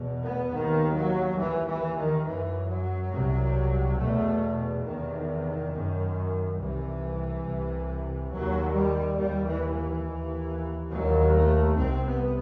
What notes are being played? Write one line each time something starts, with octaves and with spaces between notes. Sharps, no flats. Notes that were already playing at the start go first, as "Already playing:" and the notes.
Already playing: E2 B2
B3
D#2 D#3
F#3
D#2 E3
E3
D#3
F#2 E3
F#3
C2 C3
E2 B2 A3
E2 C3 D#3
F#2
C2 C3 E3
C2 C3
D#2 F#3
G3
D#2 G3
E3
E3
D#2
D#2 F#3
A3
C2 C3 C4
B3